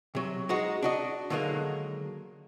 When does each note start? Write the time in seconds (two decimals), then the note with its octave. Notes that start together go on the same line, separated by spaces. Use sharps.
0.15 C3 F#3
0.49 G#3 D#4 F#4
0.82 D4 F#4 D#5
1.30 D3 D#3 F#3 G#3 A#3